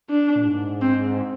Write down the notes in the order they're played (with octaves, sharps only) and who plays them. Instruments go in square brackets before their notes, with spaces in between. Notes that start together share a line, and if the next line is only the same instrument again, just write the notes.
[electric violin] D4
[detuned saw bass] A#2
G#2
[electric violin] C4